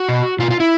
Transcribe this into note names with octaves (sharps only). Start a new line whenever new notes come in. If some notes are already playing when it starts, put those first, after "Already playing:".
Already playing: F#4
B2
B2 F4
F4
E4